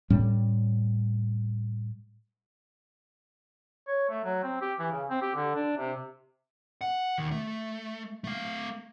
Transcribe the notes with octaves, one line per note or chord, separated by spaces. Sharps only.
A2 G3 C#4
C#5
A3
F#3
C4
G4
E3
C#3
C4
G4
D3
D4
C3
F#5
D#2
A3
A3 F5